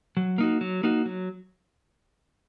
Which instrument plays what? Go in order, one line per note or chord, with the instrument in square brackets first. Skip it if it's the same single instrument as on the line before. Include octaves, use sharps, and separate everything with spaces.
[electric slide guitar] F#3
A#3 D#4 F#4
F#3
A#3 D#4 F#4
F#3